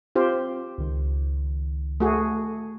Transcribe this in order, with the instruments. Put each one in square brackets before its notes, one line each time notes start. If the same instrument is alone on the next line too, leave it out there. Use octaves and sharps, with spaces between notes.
[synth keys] C4 [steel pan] F4 G4 C5
[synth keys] C#2 D#3
[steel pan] A3 F#4 G#4